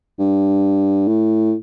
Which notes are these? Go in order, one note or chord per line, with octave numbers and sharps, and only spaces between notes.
G2
A2